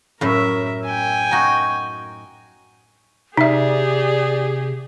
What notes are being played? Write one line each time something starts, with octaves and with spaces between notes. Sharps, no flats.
F#2 A2 A#4 E5
G5 G#5
D#4 F#4
C3 D#4 G4 G#4 D5 E5